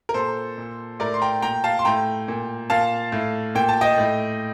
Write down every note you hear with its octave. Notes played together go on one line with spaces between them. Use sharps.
A#4
A#2 A4 C5
A#2
A2 A#4 D5
C6
G5 A#5
A#2 G5 A#5
F5 A5
C6
A2 G5 A#5
A#2
A#2 F5 A5
A2
A#2 G5
A5
D#5 G5
A2